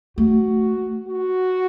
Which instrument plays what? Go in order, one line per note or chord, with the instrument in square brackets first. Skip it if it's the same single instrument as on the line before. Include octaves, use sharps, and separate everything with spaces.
[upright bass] A3 [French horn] F#4
[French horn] F#4